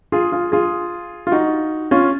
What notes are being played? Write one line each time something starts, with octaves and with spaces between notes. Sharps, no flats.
F4 G#4
F4 G#4
F4 G#4
F4
D#4 F#4
C#4 F4